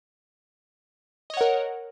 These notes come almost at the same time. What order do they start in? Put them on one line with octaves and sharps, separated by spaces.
D#5 C#5 F#5 A#4